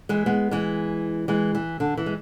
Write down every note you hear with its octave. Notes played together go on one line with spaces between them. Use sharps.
E3 G#3
G#3 B3
E3 G#3
E3 G#3
E3
D3
E3
G#3